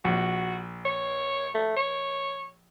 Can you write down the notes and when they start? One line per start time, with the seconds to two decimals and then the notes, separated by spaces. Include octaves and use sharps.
0.05 A#1 F#4
0.85 C#5
1.55 A3
1.76 C#5